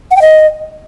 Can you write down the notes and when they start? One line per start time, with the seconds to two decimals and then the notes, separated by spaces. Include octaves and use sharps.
0.11 F#5
0.16 G5
0.22 D#5